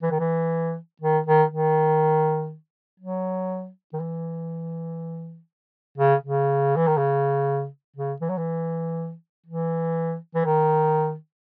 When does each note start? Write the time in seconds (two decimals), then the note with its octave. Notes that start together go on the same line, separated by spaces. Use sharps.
0.02 E3
0.11 D#3
0.20 E3
1.01 D#3
1.26 D#3
1.51 D#3
3.00 F#3
3.93 D#3
4.00 E3
5.98 C#3
6.24 C#3
6.77 E3
6.87 D#3
6.98 C#3
7.96 C#3
8.21 E3
8.29 F#3
8.37 E3
9.46 E3
10.35 E3
10.45 D#3